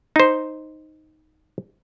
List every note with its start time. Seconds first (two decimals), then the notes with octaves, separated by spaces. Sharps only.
0.16 D#4 C5